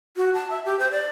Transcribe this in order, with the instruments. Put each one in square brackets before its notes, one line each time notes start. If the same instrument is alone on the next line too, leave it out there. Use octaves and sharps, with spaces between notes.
[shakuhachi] F#4
A5
E5
G4
C5
D5